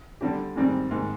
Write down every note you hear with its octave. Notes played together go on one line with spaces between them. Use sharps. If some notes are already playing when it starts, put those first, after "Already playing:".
D3 G3 D4 G4
G#2 D#3 G3 C4
G#2 D#3 A#3 D#4